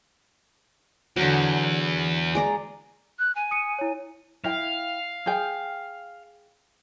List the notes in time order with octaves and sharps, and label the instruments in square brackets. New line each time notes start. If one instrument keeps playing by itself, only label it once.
[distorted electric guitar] E2 [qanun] D3 F#3
[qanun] G#3 D5 A#5
[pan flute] F#6
G#5
[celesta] D#6 C#7 D#7
E4 C#5
[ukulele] E4 G5 [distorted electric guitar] F5
[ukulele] G#4 G5